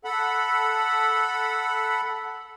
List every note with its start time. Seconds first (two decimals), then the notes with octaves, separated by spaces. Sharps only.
0.05 A4 F#5 B5